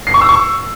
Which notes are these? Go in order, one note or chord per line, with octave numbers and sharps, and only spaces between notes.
C7
C#6
E6
C#6